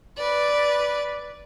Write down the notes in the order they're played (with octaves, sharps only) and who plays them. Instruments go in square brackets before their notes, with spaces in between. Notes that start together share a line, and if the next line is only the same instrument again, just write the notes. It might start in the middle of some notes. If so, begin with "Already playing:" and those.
[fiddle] B4 D5